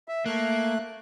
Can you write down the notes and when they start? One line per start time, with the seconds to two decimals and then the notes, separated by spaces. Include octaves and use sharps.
0.08 E5
0.26 A3 A#3 F#6